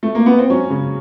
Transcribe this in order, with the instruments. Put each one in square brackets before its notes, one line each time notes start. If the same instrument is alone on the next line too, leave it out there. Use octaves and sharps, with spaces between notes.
[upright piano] A3
A#3
B3
C4
F#3 C#4
C#3